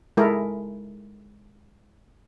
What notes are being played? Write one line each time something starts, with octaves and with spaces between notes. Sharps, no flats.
G#3 E4 A4 A#4